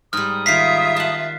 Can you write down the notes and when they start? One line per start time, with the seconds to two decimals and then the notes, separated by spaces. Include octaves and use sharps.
0.13 G#2 G3 D#6 F6
0.46 D#3 F4 E5 F5 B6 C7
0.96 F#5 A5